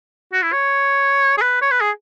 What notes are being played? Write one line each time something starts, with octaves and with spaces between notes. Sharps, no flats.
F#4
E4
C#5
G#4
B4
C#5
B4
G#4